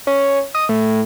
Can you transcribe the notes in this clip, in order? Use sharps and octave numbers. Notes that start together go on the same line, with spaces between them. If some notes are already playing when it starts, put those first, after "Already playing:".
C#4
D#5
A2